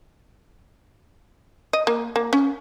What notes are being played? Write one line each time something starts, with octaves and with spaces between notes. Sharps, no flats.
D#5
A#3
A#3
C#4